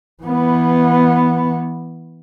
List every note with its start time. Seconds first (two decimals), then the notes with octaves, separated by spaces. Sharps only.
0.23 E3 B3